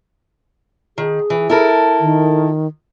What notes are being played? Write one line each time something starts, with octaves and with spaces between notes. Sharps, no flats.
D#3 G#4
E3
E4 A4 A#4
D#3